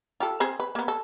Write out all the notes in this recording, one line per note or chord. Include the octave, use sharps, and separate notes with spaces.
F4 G4 A4
C4 G#4 C5
B4
A#3 B3
A4